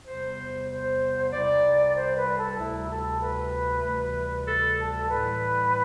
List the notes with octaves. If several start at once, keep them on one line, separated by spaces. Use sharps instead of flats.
E2 C3 G3 C5
C5
C2 C3 G3 D5
C5
B4
A4
D2 C3 G3 E4
A4
B4
D2 C3 E3 G3
A4
A4
A2 E3 G3 B4